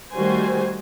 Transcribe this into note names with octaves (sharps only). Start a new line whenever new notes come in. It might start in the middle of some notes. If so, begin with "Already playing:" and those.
D#3 G3 A3 F#4 C5 G#5